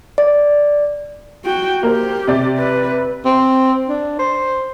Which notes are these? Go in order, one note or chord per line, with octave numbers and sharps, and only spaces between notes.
D5
F#4 G5
A#3 G4 A#4 C5
C3 C4 D5
B4
C4
D4
C5